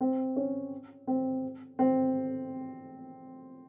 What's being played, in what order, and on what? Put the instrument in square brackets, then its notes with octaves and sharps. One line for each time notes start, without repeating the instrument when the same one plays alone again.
[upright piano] C4
C#4
C4
C4